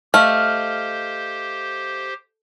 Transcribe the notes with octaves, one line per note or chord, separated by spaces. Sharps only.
A3 G4 C5 D#5 F5 F6